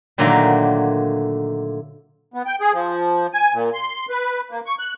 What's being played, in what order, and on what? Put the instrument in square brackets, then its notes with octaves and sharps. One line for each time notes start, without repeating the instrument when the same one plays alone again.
[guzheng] A#2 D3 D#3 F#3 A3 A#3
[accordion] B3
G5
G#4
F3
G#5
A#2
C6
B4
A#3
C#6
F#6